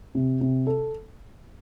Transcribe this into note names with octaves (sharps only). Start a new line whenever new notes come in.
C3
C3
A4